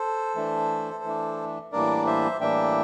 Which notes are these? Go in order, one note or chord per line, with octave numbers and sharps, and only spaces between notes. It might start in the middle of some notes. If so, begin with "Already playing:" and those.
Already playing: A4 C5
E3 A3 D4
E3 A3 D4
A2 E3 G3 A#3 D4 A#4 D5
C5 E5
A2 E3 G3 A#3 D4 E5 G5